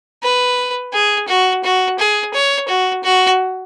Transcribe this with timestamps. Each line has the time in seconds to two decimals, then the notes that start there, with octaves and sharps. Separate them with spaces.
0.23 B4
0.93 G#4
1.28 F#4
1.64 F#4
1.99 G#4
2.34 C#5
2.68 F#4
3.04 F#4